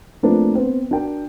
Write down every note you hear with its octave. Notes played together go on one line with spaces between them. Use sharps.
F3 A3 A#3 C4 D4 B4
B3 C4
D4 F#4 A#4 G5